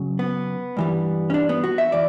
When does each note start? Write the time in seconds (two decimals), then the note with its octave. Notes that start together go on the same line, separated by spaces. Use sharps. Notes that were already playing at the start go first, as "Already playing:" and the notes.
Already playing: F#2 C#3 F#3
0.19 B3
0.77 G2 E3 G3
1.30 C#4
1.34 D4
1.49 B3
1.64 F#4
1.78 E5
1.92 E3 D5